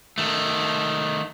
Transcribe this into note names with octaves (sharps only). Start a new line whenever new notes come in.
D#3 A3